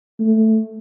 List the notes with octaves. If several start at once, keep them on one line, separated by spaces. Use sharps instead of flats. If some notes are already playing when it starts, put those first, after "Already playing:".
A3